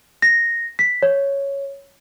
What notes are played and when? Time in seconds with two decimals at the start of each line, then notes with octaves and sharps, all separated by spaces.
0.22 A#6
0.79 B6
1.03 C#5